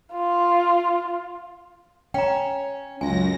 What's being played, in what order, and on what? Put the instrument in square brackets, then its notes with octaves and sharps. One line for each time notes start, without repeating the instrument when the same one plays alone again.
[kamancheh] F4
[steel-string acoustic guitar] C#4 [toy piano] G5 A#5
[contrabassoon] C#2 [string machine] F#2 A#6 [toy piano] G#5